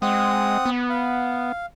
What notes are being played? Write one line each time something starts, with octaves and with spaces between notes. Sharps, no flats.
G#3 C4 F#5 D#6
B3
F5